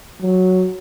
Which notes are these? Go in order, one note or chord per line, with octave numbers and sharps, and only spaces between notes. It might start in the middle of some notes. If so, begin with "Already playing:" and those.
F#3